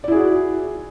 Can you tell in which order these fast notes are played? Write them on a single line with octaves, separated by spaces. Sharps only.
D5 E4 G#4 F#4